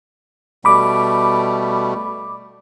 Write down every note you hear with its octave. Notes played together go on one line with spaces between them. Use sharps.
B2 G3 A3 B5 D6